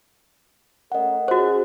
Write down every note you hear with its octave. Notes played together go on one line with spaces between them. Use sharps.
A3 C#4 A#4 D#5 F#5
C#4 F#4 G#4 C5